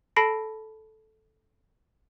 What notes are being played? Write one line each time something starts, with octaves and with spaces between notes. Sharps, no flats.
A4 A5 B5 A#6 C7 D7